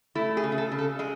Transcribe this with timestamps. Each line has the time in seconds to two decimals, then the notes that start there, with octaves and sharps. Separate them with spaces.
0.15 A3 E4
0.37 G#4
0.43 C#3
0.52 G#4
0.58 A4
0.72 C#3
0.78 A4
0.99 G#3 G#4